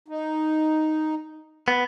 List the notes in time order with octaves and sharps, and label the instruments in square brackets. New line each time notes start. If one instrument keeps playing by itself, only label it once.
[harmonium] D#4
[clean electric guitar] B3